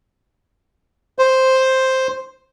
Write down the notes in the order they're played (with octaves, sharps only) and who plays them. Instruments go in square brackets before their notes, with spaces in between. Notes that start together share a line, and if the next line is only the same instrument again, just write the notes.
[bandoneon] C5